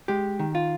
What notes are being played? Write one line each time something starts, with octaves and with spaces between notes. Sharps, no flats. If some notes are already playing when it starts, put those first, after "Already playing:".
G#3 G4
D#3
F4